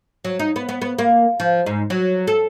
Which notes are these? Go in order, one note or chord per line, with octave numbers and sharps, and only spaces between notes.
F#3
D#4
B3
B3
B3
A#3
F3
G#2
F#3
A4